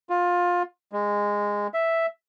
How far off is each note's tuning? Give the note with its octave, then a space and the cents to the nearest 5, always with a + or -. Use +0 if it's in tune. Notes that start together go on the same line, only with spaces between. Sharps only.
F4 +20
G#3 -15
E5 +0